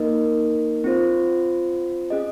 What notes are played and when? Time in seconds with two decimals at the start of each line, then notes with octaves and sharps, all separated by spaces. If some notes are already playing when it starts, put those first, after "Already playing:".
Already playing: A#3 D#4 A#4 D#5
0.84 C4 F4 C5
2.10 C#4 G#4 D#5